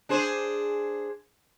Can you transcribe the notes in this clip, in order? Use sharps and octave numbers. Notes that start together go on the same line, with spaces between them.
D4 G#4 C5